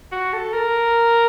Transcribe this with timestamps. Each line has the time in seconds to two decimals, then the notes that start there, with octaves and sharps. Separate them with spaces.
0.12 F#4
0.33 A4
0.54 A#4